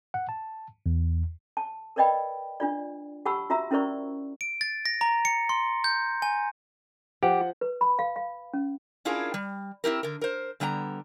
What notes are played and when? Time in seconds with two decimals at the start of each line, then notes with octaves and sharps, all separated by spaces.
0.14 F#5
0.29 A5
0.86 E2
1.57 A5
1.96 A#4 B4 D5 D#5 G5 B5
2.60 D4 F4 D5
3.25 G4 F#5 A5 B5 C#6 E6
3.50 F4 F#4 E5 A#5 E6
3.71 C#4 E4 A#4 C5 D5 C#6
4.41 D7
4.61 A6
4.86 A#6
5.01 A#5
5.25 C#7
5.49 C6
5.84 G6
6.22 G#5
7.23 F3 G4 F#5
7.61 B4
7.81 B5
7.99 F5
8.16 F5
8.54 C#4
9.05 C#4 D4 E4 F4 G#4 A#4
9.34 G3
9.84 C4 E4 G4 A#4
10.03 D3 A#4
10.21 A#4 C5
10.60 D3 G3 B3 G5 A#5